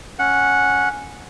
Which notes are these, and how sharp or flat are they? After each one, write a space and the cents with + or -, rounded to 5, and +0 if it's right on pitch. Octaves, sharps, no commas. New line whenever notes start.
C#4 +0 F#5 -10